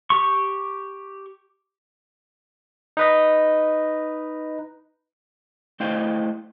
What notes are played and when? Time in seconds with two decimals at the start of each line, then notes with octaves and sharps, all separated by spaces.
0.10 G4 C#6
2.97 D#4 B4 D#5
5.80 A3 E4 C5 D#5 F5 G5